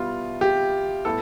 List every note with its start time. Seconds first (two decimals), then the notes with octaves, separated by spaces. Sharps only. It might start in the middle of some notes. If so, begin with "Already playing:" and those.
Already playing: B2 G3 B3 E4 F4
0.41 G4
1.05 A2 G3 B3 E4 A4